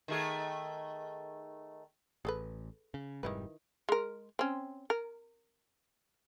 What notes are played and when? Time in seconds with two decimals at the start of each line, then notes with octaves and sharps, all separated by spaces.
0.08 D#3 A3 G#4
2.25 A1 G#4 A4 B4
2.94 C#3
3.23 F1 G#2 D#3 G3 E4 B4
3.89 G#3 A#4
4.39 C4 C#4
4.90 A#4